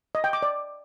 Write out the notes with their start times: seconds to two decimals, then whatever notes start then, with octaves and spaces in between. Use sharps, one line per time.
0.15 D#5
0.24 G5
0.33 D6
0.43 D5